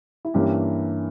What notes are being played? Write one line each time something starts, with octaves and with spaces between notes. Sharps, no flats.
E4
G2 E3 A#3 C#4 G4